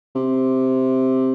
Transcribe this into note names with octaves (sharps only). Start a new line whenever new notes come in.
C3